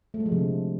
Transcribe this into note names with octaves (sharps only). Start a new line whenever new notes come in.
A3
G#3
F3
C3
D3